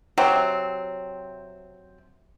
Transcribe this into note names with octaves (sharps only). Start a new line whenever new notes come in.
C3 F#3 C4